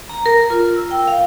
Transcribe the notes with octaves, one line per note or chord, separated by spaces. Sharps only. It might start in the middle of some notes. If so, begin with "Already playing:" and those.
A#5
A#4
F4
E6
G5
F5